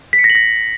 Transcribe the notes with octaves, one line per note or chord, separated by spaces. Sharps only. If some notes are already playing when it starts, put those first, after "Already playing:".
B6
C#7
A#6
F#7
A#6